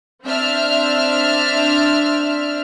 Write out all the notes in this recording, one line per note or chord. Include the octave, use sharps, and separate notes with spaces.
C4 D4 E5 F6